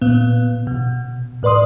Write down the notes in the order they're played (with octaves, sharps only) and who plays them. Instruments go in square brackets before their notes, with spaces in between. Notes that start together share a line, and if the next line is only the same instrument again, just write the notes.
[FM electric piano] A#2 B3
B2
A2 B4 D5 C6 D#6